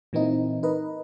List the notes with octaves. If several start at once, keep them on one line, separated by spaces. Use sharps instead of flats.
A#2 E3 A#3 C4 D#4 E4
D#4 A#4 B4 D#5